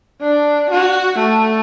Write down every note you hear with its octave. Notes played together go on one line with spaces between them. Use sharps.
D4
F#4
A3